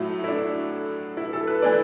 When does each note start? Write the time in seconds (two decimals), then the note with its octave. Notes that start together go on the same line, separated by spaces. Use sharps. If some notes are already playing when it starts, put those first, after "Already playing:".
Already playing: A2 F#3 A3 E4
0.24 E4
0.28 D4
1.17 E4
1.33 A4
1.47 B4
1.62 E3 A3 E4 D5